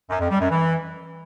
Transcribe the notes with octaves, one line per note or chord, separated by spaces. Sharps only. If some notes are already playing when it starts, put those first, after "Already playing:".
F#2
F2
G3
F#2
E3